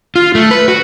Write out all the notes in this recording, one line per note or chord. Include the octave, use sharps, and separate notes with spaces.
F4
A3
B4
F#4